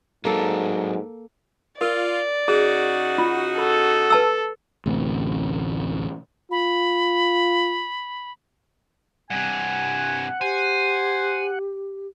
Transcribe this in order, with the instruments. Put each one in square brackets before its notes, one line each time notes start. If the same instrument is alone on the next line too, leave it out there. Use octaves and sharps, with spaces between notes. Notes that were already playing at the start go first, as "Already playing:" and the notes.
[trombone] G#2 [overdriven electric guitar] F#3 D4 [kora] A#3 A4
[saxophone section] F4 [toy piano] A#4 [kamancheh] D5
[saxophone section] C#3 D#4 F#4 [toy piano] G#4
[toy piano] F4
[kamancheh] A4 [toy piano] B5
[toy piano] B4 A5 E6
[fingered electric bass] A1 D2 C3
[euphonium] F4 [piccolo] B5
[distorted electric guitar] G2 C3 [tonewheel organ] F#5 [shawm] G#5
[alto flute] G4 [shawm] C5 [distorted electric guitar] G#5